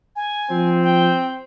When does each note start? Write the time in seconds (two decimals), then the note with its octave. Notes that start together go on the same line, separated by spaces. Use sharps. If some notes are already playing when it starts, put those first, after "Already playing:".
0.16 G#5
0.50 F3 C4
0.83 G5